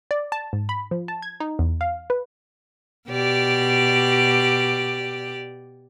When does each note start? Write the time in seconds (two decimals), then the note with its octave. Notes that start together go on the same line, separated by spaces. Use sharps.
0.11 D5
0.32 A5
0.53 G#2
0.69 B5
0.91 F3
1.08 A5
1.22 G#6
1.40 D#4
1.59 E2
1.81 F5
2.10 B4
3.08 B2 G4 D5